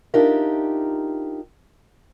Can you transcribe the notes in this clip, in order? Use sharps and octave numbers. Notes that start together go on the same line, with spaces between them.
D4 D#4 F4 G4 A#4 E5